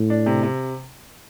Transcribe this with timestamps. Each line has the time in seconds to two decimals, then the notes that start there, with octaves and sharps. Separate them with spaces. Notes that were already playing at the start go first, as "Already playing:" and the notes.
Already playing: A2
0.10 D4
0.26 C3
0.43 C3